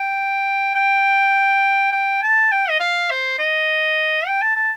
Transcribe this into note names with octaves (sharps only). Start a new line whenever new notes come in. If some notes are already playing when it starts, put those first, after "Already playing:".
Already playing: G5
G5
G5
A5
G5
D#5
F5
C5
D#5
G5
A5
A5